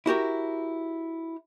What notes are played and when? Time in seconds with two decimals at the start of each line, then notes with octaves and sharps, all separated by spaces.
0.06 E4 F#4 G4 A#4